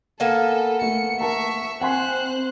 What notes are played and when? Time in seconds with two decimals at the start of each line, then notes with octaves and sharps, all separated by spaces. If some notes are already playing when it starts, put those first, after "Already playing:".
0.20 A#3 B3 A4 G#5
0.81 A3 A4 C#7
1.21 A#4 E5 A5 A#5 C#6
1.81 C4 C5 F#5 G#5 C6 F#6